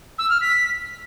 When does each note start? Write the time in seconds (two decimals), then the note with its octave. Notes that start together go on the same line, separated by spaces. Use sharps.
0.19 E6
0.30 F6
0.41 B6